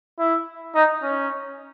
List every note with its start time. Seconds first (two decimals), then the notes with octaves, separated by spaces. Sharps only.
0.19 E4
0.75 D#4
1.03 C#4